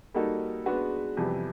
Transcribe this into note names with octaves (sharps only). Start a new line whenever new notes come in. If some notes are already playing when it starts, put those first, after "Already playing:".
G3 A#3 D#4 F#4 A4
G#3 B3 D4 F#4 B4
F2 C3 E3 G3 B3